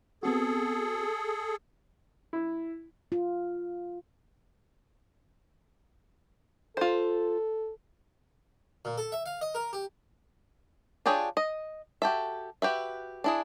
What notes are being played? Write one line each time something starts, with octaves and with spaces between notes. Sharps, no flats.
B3 C4 F#4 G#4 A4
E4
F4
F4 A4 C5
A#2
A4
E5
F5
D#5
A#4
G4
D4 F4 G4 G#4 C#5
D#5
F#4 G4 A4 E5
F#4 G4 B4 E5
D4 E4 G#4